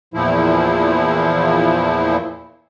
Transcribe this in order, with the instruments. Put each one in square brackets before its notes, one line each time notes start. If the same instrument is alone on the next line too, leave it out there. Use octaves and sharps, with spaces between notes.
[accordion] E2 A#2 F3 E4